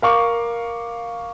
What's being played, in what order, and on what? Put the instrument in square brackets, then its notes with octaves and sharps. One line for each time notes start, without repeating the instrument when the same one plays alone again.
[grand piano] A#4 F5 C#6 D6